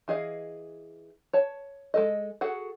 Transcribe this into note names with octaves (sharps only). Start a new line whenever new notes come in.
E3 G#4 D#5 F5
C#5 A5
G#3 A4 D#5
F#4 G#4 A4 F#5